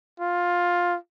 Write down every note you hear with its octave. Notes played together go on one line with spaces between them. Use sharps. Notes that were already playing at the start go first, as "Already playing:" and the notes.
F4